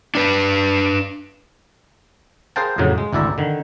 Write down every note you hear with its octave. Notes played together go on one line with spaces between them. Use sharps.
D4 B4
G#4 A#4 C5 F5 G5 A5
F2 A2 C#3 F#3
G#3
G#1 D2 E4 D5 E5 A#5
D3 D#3